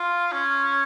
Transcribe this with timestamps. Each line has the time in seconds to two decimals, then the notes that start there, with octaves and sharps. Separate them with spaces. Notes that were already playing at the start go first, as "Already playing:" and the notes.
Already playing: F4
0.32 C#4